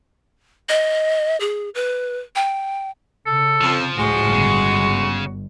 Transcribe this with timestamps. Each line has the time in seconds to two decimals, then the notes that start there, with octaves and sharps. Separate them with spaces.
0.69 D#5
1.40 G#4
1.75 B4
2.36 G5
3.26 C#3 A4
3.61 F2 F3
3.98 D2 A2 G#3 F#4
4.33 G1 C#3